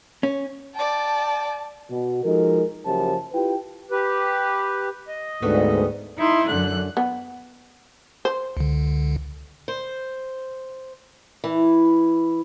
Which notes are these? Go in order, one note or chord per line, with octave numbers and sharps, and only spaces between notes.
C#4
D5 G5 A5
B2
F3 G#3 D#4 F#4 A4 A#4
F#1 F#2 F3 G4 C5 A5
E4 F4 G4 B4 G5
G4 B4
D#5
D2 G#2 G3 A3 B3
D#4 E4 C6
F#2 D3 F#6
B3
C5
C#2 D3
C5
E3